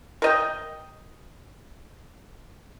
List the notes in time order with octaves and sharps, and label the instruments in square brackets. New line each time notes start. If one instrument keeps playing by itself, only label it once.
[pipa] A#4 D#5 G5